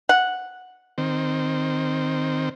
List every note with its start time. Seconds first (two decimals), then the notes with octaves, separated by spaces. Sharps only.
0.09 F#5
0.98 D#3 C4